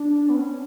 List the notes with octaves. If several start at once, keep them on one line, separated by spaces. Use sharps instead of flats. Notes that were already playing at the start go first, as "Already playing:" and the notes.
Already playing: D4
B3
C#4